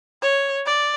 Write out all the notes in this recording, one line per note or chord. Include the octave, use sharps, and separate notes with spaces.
C#5
D5